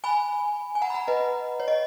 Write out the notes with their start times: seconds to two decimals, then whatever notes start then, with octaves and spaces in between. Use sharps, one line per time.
0.04 G#5 B5
0.75 G#5
0.82 F#5 A#5
0.90 B5
0.94 F#5 A#5
1.08 B4 D#5
1.60 C#5
1.68 D#5